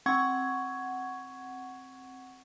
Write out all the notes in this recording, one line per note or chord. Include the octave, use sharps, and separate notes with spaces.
C4 F#5 C#6 G#6